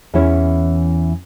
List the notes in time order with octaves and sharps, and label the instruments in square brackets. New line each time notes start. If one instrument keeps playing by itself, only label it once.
[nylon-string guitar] E2 E3 C#4 E4 C#5